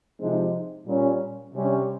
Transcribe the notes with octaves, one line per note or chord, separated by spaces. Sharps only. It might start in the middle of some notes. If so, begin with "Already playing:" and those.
C3 F3 G#3 C4 D#4
A#2 G3 C#4
C3 G3 C#4